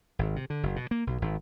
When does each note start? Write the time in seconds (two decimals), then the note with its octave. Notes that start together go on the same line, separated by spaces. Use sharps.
0.19 G#1
0.36 C3
0.50 D3
0.63 F#1
0.76 B2
0.91 A#3
1.07 B1
1.22 G#1